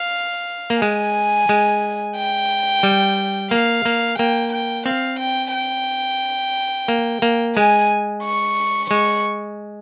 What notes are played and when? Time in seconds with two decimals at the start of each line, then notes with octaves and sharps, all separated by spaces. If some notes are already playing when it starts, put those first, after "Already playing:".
Already playing: F5
0.70 A#3
0.81 G#3 G#5
1.49 G#3
2.16 G5
2.83 G3
3.51 A#3 F5
3.85 A#3
4.19 A#3 G5
4.53 G5
4.86 C4 F5
5.20 G5
5.54 G5
6.88 A#3
7.22 A#3
7.56 G#3 G#5
8.24 C#6
8.90 G#3 C#6